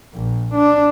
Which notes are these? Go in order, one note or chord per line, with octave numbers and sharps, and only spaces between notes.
A#1
D4